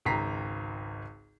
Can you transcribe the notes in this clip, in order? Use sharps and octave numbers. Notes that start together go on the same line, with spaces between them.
G#1 C#2 G5 A#5 B6 C7